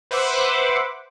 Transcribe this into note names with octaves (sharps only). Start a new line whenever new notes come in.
B4 C5 E5 F#5 D6